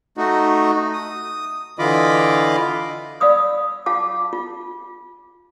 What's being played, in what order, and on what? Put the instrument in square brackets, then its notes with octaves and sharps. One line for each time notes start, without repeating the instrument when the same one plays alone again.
[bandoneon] A3 D#4 F#4
D#6
D3 E3 F4 D#5 B5 D6
[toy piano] D5 F5 B5 D#6 E6
F4 F5 G5 A5 D6
F4